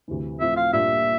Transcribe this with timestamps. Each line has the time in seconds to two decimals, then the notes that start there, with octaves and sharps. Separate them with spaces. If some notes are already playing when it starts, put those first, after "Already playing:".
0.08 D2 C3 E3
0.40 A2 F3 A3 C4 F4 E5
0.57 F5
0.72 A#2 G3 A#3 D4 F4 E5